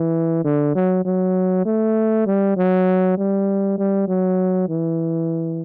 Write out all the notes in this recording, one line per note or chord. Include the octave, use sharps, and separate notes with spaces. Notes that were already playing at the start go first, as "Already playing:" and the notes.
Already playing: E3
D3
F#3
F#3
A3
G3
F#3
G3
G3
F#3
E3